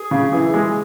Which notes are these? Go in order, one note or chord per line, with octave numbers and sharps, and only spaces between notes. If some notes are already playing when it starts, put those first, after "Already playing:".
Already playing: G#4
C#3
E3 G#4
G#3